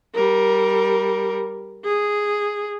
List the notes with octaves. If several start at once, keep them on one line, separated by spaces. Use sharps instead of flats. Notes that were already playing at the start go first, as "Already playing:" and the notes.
G3 A#4
G#4